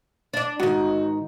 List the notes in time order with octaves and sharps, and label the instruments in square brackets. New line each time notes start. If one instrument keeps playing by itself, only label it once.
[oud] D4 D5
[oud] G#2 D#3 [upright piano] F#4